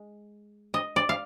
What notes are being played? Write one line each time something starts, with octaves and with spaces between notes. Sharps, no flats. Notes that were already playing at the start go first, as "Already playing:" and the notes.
Already playing: G#3
D#5
D5
F5